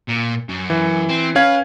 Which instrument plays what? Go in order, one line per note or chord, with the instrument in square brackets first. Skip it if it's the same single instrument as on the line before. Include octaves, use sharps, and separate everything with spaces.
[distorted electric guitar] A#2
F#2
[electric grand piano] E3
[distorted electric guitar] C4
[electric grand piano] C#4 F5 G#6 [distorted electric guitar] B4